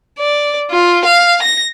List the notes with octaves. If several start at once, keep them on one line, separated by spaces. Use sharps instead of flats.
D5
F4
F5
A#6